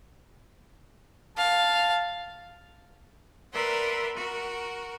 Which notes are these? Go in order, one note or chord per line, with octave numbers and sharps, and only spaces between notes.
F5 A5
A#4 B4 D5 E5 F#5 C6
F#4 A#4